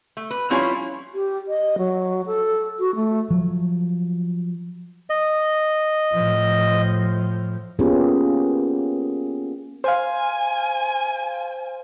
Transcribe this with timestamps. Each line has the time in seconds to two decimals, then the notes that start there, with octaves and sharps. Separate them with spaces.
0.17 A3
0.31 B4
0.50 F3 G3 C#4 E4 F4 C#5
1.14 G4
1.48 D#5
1.78 F#3
2.26 A4
2.80 F#4
2.95 A3
3.30 F3 F#3
5.10 D#5
6.13 A2 F3
7.79 A#3 B3 C#4 F4 G4 G#4
9.84 C5 F5 G#5